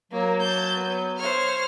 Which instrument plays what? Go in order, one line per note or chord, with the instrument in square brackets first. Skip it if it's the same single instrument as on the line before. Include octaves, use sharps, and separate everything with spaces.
[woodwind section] F#3 [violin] A#3
[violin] A5 G6
B3
[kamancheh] C5 C#5 [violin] F6